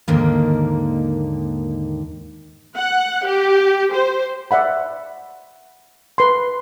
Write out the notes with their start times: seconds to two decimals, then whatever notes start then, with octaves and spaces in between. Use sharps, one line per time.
0.08 D#2 G#2 D3 D#3 A#3
2.77 F#5
3.27 G4
3.93 C5
4.51 D5 E5 F#5 B5
6.18 B4 C6